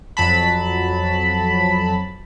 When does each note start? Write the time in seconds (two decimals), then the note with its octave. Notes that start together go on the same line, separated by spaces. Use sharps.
0.17 F2 F#3 A5 B5